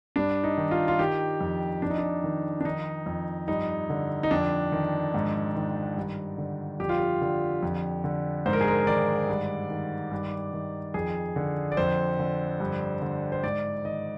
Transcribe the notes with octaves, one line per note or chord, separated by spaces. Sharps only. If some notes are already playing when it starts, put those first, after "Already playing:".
G2 D4
D#4
D#3
F4
F4
D#3 G4
F2
F2 D4
D#4
D4
D#3
D4
D#3 D#4
F2
G2 D#4
D3
D#4
F2 D4
D#3
G#2
D#3
G2
D3
F2 G4
F4
G4
D3
F2
D3
G#2 C5
A#4
G#4
A#4
D#3 D5
G2
D#3
G2
D#3
F2 G#4
D3
D5
F2 C5
D3
G2
D3
C5
G#2 D5
D#3 D#5